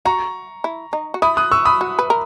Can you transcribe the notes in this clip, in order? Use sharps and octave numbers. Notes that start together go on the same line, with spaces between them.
F#4 A#5 C#6
E4
D#4
F#4
E4 B5 D#6
D#6 F#6
C#6 E6
B5 D#6
F#4
B4
A#4